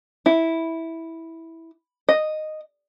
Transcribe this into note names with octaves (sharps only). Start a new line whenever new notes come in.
E4
D#5